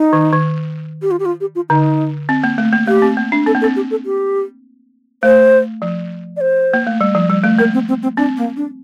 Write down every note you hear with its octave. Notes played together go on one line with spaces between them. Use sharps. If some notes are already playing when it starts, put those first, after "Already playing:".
Already playing: D#4
D#3
D#3
G4
F4
G4
F4
G4
F4
D3 D#4
C4
A#3
A3
A#3
A3 G4
C4
A#3
D4
C4 A4
A#3
A4
C4
G4
A4
G4
A3 C5
F3
D5
C5
A#3
A3
G3
F3
G3
A3
A#3 A#4
C4
C4
C4
C4 D4
A#3
D4